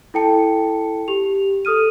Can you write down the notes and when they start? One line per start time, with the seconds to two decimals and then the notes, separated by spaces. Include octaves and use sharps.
0.14 E4 A4 G5 A5 C#7
1.08 G4 F7
1.65 A4 D#6 F6 D#7